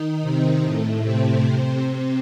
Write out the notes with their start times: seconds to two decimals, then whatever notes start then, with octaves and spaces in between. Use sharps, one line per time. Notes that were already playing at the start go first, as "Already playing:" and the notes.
Already playing: D#3 D#4
0.22 C3 C4
0.63 A2 A3
1.03 C3 C4
1.44 C3 C4
1.84 C3 C4